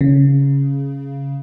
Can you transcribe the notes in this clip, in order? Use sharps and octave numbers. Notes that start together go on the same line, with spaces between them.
C#3